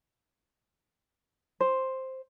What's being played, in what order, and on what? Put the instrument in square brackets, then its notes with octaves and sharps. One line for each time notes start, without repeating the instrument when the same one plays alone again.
[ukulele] C5